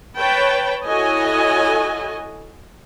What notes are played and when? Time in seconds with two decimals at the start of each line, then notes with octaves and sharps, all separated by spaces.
0.17 B4 C#5 G5 A5 B5
0.84 E4 F#4 A4 C#5 D#5 G#5